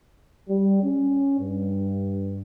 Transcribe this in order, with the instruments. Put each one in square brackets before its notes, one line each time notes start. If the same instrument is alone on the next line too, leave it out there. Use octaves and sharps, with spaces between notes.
[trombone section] G3
C#4
G2